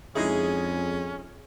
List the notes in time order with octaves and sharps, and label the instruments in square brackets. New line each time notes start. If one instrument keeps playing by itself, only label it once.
[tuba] F2 [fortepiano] G#3 D#4 E4 [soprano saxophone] C#4 [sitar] G#4